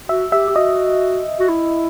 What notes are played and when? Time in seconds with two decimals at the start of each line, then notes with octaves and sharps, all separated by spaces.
0.09 F#4 E5
0.32 G4 E5
0.49 G4
0.56 F#4 D#5
1.40 F#4
1.49 E4